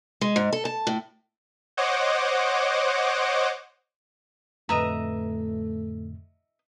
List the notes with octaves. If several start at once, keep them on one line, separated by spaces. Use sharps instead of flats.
G#3
G#2
A4
A5
A2
C5 C#5 D#5 F#5 D6
F2 A2 D3 A3 B4 D#5 E5 A#5